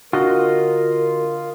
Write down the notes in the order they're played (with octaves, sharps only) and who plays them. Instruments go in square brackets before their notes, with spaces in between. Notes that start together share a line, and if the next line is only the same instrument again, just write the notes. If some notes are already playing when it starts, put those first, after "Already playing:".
[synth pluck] D3 [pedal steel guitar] F4 D#5 [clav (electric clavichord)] F#4 [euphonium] A#4